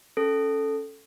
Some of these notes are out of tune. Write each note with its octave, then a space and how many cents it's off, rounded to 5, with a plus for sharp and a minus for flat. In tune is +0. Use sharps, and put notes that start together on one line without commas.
C#4 +0 A4 +0